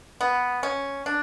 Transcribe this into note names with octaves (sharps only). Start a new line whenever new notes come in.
B3
C#4
D4